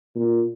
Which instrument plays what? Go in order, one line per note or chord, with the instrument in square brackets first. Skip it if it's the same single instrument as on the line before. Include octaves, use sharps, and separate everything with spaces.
[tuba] A#2